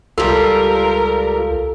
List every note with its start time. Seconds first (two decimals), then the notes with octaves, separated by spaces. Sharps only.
0.18 C#2 G3 F4 A4 A#4